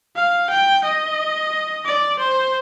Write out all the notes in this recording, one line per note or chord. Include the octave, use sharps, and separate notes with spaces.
F5
G5
D#5
D5
C5